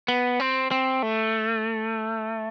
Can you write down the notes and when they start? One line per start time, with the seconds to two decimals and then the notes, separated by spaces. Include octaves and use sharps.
0.08 B3
0.40 C4
0.71 C4
1.03 A3